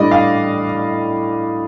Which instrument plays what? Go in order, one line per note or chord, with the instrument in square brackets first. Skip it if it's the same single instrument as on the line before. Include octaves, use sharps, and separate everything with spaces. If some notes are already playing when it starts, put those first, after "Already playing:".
Already playing: [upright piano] A2 G3 D4 [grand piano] D5 D#5
[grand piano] F5